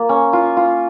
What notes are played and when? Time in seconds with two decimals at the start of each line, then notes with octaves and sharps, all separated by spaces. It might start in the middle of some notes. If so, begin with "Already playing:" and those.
Already playing: A#3 F4
0.09 C#4
0.33 F4
0.57 F4